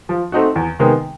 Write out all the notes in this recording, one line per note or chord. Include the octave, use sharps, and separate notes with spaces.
F3
A3 C4 D#4 F#4
E2
C3 D#3 G#3 B3